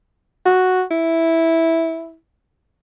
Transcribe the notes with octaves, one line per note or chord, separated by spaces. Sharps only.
F#4
E4